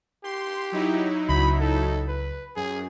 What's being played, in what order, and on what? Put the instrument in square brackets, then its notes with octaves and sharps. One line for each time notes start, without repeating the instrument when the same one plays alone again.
[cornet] G4 [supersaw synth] C6
[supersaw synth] F#3 D#4 E4
[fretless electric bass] C#2 [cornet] B5
[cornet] A4
B4
[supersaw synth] F#2 [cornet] G#4